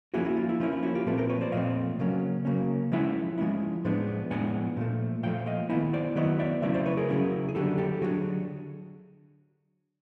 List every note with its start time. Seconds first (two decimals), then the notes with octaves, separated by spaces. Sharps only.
0.14 F3 A#3 C#4 E4 F#4 G#4
0.25 E4 F#4
0.37 F4
0.49 E4
0.60 F3 A#3 C#4 E4 F4
0.72 E4
0.83 E4 F#4
0.95 F4 G4
1.06 A#2 F3 A3 C4 A4 B4
1.18 A#4 C5
1.29 B4 C#5
1.41 C5 D5
1.52 A#2 F3 A3 C4 D#5 F5
1.99 C#3 F#3 A#3 C#4
2.45 C#3 F#3 A#3 C#4
2.92 F3 G#3 C#4 E4 E5 F#5
3.38 F3 G#3 C#4 E4
3.85 A2 F3 G#3 B3 D4
4.30 A2 F3 G#3 B3 D4 F#5 G#5
4.77 A#2 F3 A3
5.23 A#2 F3 A3 F5 G5
5.46 D#5 F5
5.70 D#3 F#3 B3 E4 F#5 G#5
5.93 C5 D5
6.16 D#3 F#3 B3 E4 C#5 D#5
6.39 D5 E5
6.62 C#3 F#3 A3 C#4 E4 D5 E5
6.74 C5 D5
6.85 B4 C#5
6.97 G#4 A#4
7.08 C#3 F#3 A3 C#4 E4
7.49 G#4
7.55 D3 F#3 A3 D4 G4 A4
7.78 G4 A4
8.01 D3 F#3 A3 D4 F#4 G#4